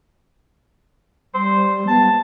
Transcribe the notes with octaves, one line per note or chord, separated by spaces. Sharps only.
G3 C5
B3 A5